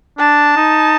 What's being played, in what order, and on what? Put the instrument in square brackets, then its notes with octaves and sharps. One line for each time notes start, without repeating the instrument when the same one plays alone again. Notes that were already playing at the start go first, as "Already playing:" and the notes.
[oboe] D4 [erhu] A5
[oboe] D#4